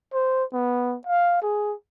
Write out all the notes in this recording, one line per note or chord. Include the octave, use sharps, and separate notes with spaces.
C5
B3
F5
G#4